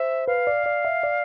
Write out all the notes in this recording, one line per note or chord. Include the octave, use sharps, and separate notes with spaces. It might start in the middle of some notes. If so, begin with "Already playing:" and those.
Already playing: C5 E5
B4 F5
D5
D5
E5
D5